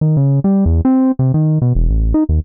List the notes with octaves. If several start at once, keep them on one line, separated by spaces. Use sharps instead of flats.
D#3
C#3
G3
E2
C4
C3
D#3
B2
E1
A1
D#4
D#2